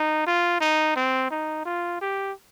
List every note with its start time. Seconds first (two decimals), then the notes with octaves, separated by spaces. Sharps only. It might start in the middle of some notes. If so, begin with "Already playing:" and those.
Already playing: D#4
0.27 F4
0.61 D#4
0.96 C4
1.31 D#4
1.65 F4
2.01 G4